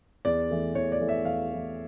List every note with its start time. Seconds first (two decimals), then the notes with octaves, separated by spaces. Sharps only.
0.25 E2 D5
0.51 E3 A3
0.75 E2 C#5
0.92 D5
1.01 E3 A3
1.08 E5
1.25 E2 F5
1.50 E3 A3